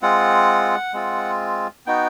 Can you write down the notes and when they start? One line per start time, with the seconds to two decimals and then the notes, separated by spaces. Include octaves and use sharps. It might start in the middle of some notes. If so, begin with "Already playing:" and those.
0.02 G#3 C4 F4 F#5
0.94 G#3 C4 F4
1.86 B3 D#4 F#4 G5